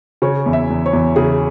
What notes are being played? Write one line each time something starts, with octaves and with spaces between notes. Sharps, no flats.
C#3 C#5
E2
E5
E2
C#5
E2
C#3 G#4